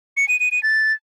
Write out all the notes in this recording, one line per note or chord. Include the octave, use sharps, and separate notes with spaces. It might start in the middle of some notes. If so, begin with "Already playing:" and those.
C#7
D#7
D#7
D#7
A6